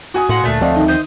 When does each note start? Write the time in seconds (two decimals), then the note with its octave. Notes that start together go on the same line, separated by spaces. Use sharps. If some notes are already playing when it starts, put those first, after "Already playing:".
0.14 F#4 G#5 D#6
0.29 A2 A#3 F#5 C6
0.44 D2 A#2 A3 D4
0.61 D2 F3 C4 D5 D#5 F5
0.76 D#3 D#4
0.88 C5 D#5